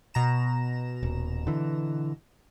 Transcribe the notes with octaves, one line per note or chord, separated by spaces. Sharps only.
B2 A#5 E7
D#1
D3 E3